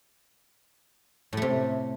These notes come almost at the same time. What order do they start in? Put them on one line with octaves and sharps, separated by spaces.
A2 A3 C3